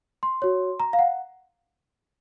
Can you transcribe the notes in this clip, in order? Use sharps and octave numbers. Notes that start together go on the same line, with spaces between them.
C6
F#4 C#5
A#5
F5
F#5